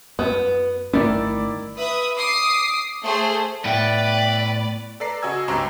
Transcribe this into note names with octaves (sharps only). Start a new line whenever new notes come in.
F#2 B3
G1 D#3 A3 C#4 E4 D5
B4 E5 D#6
D6 D#6 C7
A3 G#4 C5
A2 B3 B4 D5 E5 G5
A4 B4 D5 A#5 C7
C#3 F#4 D#5 G#5 E6 G#6
C#2 G2 C4 G4 A#5 E7